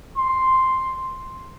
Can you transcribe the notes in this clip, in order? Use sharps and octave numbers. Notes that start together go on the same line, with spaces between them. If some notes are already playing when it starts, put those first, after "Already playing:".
C6